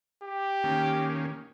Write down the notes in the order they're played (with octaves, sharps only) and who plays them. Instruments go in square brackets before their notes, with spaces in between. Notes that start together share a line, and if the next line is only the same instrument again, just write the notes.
[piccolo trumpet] G4
[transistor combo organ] D#3 A#3 C#4